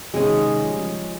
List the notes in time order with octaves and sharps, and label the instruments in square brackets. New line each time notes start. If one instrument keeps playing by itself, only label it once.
[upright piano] C3 D#3 [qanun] G#3 C#4 G#4
[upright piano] F3
G3
C#3 F3